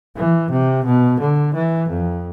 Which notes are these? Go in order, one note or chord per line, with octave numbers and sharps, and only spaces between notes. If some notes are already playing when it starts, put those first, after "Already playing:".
E3
C3
B2
D3
E3
F2